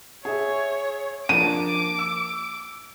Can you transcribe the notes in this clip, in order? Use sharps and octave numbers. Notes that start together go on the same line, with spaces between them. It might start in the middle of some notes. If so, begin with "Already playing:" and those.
G#4 C#5 E5
F3 A#3 D4 D6 D#7
E6